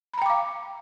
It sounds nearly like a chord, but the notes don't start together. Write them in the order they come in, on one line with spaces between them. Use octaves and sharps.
B5 A#5 G5 D6 F5